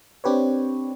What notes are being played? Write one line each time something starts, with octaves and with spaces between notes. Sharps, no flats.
C4 D4 G4 B4 C#5